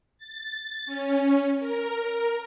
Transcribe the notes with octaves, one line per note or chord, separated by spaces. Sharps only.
A6
C#4
A#4